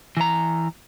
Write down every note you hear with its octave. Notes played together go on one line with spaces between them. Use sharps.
E3 A#5